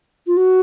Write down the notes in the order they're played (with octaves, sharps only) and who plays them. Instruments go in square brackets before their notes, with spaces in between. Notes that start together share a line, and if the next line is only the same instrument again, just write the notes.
[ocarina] F4
F#4